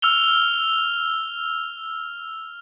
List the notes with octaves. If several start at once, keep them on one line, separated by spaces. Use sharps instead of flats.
E6 F6 F7 G7